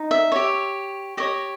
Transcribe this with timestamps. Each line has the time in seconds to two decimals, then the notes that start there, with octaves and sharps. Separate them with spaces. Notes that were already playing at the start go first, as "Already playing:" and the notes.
Already playing: D#4
0.11 E5
0.32 G4 C#5
1.17 G4 C#5 D#5